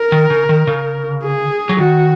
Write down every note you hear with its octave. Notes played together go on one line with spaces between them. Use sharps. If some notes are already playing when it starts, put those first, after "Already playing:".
Already playing: A#4
D#3
C#3
D#3
C#3
G#4
F#3
D#3 F#4